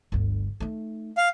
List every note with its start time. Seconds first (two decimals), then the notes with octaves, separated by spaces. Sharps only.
0.12 G1 D2
0.60 A3 D#4
1.18 F5